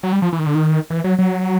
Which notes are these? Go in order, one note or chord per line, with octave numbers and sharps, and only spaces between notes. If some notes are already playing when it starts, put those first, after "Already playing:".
F#3
G3
F3
E3
D#3
D3
D#3
E3
F#3
F#3